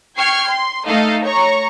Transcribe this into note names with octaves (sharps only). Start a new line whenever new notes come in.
G5 C#6 F6 G#6 C7
C6
A3 D#4 A4 D#5 F5
C#5 A#5 C#6